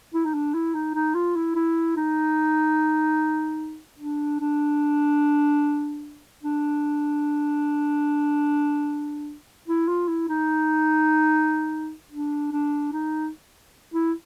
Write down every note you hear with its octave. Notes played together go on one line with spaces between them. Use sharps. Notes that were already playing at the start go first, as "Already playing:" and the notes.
E4
D#4
D4
E4
D#4
D#4
F4
E4
E4
D#4
D4
D4
D4
E4
F4
E4
D#4
D4
D4
D#4
E4